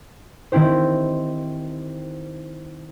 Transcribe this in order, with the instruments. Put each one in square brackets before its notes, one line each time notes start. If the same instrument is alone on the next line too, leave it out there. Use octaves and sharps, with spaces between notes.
[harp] D#3 C4 E4 G4 C5